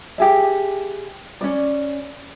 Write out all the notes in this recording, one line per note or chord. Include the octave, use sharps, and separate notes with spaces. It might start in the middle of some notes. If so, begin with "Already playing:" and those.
G4 G#4 E5
C#4 D4 D5